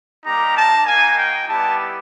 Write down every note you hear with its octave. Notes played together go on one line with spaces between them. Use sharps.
G3 A#3 D#4 G4 A#5
A5
A#3 D#4 F#4 G#5
G5
G3 B3 E4 G4 A5